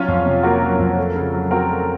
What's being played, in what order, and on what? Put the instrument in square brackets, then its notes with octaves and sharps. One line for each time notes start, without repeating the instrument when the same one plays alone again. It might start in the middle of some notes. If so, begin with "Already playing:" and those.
Already playing: [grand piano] F#3 [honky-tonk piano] C#4 F4
[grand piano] F2
C3
[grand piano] A#3 [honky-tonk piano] F#4 A#4
[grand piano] F#3
F2
A3
C#3
F#3
[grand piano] C4 [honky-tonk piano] F#4 A#4
[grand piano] A3